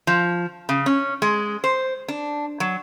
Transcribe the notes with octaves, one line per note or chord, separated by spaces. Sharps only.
F3
C#3
C#4
G#3
C5
D4
F#3